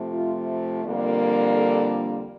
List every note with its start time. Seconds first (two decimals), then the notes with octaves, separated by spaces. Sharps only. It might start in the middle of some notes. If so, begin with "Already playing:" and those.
Already playing: C3 F3 A3
0.12 F4
0.83 F2 D3 G3 A#3 D4
1.53 A4